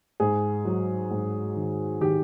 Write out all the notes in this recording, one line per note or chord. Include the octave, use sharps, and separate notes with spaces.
G#2 G#4
F#3
G#2
D#3
D#3 G4